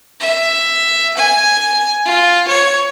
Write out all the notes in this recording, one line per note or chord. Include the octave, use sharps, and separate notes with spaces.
E5
G#5
F4
C#5